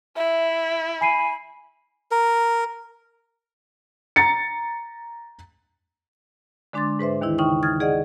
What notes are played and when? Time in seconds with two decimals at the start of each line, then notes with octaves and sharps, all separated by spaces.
0.16 E4 E5
1.01 G#5 B5 C7 D#7
2.11 A#4
4.16 A#5 A6 C#7
6.73 D3 G#3 D4 C6 D6 A6
6.99 G#2 B4 C5 E5
7.21 D#2 D#3 E3 E4
7.38 C#3 D#4 G5 C#6
7.63 D#6 F6 G#6 A6
7.80 G#4 D5 D#5 F#5